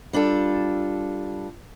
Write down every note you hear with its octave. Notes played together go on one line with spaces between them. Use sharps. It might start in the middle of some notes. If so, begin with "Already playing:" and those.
G3 D4 F4 A4